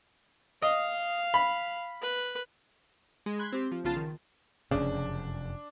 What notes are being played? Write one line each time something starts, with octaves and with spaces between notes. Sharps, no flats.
D#5 F5
B5
B4
G#3
B5 C6 F#6 G#6
C4 G4
F3
B1 C#3 B3 F4 A5 A6
D#3
F1 F#2 C#3 D4